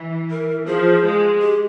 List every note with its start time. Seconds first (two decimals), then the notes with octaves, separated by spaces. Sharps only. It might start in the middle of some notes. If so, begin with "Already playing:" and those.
Already playing: E3
0.30 A#4
0.66 F3 G#4
1.04 G#3
1.41 G4